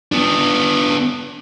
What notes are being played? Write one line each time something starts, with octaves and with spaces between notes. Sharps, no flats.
B3 D4